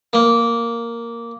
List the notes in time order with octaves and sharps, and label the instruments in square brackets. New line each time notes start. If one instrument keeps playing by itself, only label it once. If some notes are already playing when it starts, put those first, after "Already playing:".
[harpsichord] A#3